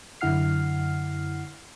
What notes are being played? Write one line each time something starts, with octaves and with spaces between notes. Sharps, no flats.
F#2 D3 E4 F#5 F6 C7